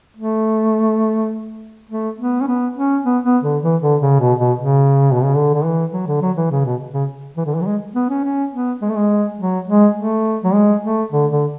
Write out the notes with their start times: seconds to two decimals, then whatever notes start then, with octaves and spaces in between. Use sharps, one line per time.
0.17 A3
1.89 A3
2.19 B3
2.41 C#4
2.47 B3
2.76 C#4
3.05 B3
3.24 B3
3.43 D3
3.63 E3
3.82 D3
4.01 C#3
4.20 B2
4.39 B2
4.59 C#3
5.12 B2
5.23 C#3
5.35 D3
5.54 D3
5.65 E3
5.93 F#3
6.07 D3
6.21 F#3
6.37 E3
6.51 C#3
6.65 B2
6.94 C#3
7.37 E3
7.46 D3
7.55 E3
7.61 F#3
7.66 G#3
7.95 B3
8.09 C#4
8.24 C#4
8.53 B3
8.81 G#3
8.89 A3
8.96 G#3
9.39 F#3
9.68 G#3
9.97 A3
10.44 F#3
10.54 G#3
10.83 A3
11.12 D3
11.31 D3